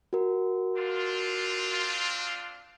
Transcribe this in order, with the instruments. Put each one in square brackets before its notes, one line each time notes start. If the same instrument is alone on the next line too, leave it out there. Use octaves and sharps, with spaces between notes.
[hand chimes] F#4 A#4
[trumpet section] C4 D4 F4